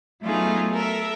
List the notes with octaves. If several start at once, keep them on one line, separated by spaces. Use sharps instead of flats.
F#3 A3 B3 D#4 F4 G#4
A4 A#4 E5